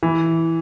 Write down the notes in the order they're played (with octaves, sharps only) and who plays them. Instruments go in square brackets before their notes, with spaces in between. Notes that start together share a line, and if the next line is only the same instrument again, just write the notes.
[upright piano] E3